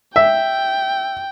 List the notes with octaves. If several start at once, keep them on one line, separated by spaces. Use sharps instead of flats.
E5 G5